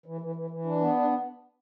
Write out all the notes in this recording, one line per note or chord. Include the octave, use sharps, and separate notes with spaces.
E3
E3
E3
E3
D4
B3
D4